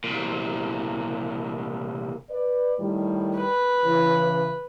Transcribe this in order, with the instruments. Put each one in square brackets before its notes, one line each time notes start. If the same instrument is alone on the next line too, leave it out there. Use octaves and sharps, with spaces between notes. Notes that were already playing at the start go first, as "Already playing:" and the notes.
[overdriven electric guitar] C2 A#2
[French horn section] B4 D5
A2 D#3 G3
[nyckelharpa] B4
[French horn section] C#3 E3